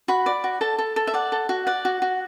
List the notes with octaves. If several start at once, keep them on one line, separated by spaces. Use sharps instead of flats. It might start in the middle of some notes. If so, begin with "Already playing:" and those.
F#4 B5
D5
F#4
A4 A5
A4
A4
E5
D5 F#5
A4
F#4
D5 F#5
F#4
F#4